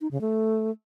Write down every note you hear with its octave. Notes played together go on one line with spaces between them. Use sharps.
D#4
C#3
A3